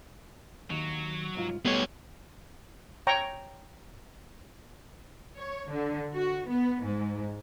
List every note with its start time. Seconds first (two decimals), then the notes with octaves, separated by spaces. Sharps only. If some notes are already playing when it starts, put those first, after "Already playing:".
0.70 D#2 F#3
1.35 C2 G#2 F4
1.65 B2 G3 A3 B3 G#4 B4 C#5
3.07 C#5 G5 A#5 C#6
5.38 C#5
5.70 D3
6.14 F#4
6.48 B3
6.82 G#2